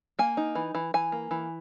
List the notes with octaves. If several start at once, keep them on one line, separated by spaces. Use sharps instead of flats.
A#3 G#5
D#4
E3
E3
E3 G#5
A#3
E3